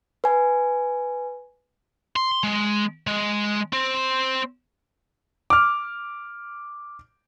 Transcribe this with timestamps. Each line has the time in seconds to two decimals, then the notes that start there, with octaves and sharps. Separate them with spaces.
0.24 B4 G#5
2.16 C6
2.44 G#3
3.07 G#3
3.73 C4
5.50 D6 F6